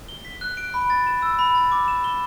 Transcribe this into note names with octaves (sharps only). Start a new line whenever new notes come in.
G7
B6
F#6
D7
B5
A6
E7
E6
B5
A6
D6
E7
G7